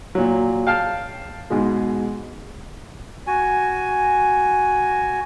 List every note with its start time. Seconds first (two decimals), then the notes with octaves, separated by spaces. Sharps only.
0.15 A#2 F#3
0.67 F5 G5 A5 F6
1.50 G#2 B2 G#3
3.27 F#4 G#5